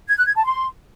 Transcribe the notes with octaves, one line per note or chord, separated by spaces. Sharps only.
G#6
F#6
G#6
A5
C6